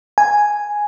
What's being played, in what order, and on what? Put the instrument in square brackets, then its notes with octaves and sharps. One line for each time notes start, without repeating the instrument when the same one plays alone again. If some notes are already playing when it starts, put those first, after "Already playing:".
[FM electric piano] G#5